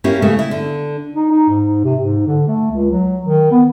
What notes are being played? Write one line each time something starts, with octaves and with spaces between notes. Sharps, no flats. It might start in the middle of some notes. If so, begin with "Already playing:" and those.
A#3 C#4 E4 G4
C#3 A3
E4
D3
D#4
D#4
G#2
C3
G#2
D3
A3
C#2
F#3
D#3
B3